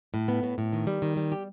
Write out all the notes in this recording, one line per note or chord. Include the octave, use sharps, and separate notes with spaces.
A2
B3
A2
A2
D#3
G3
D#3
G3
G4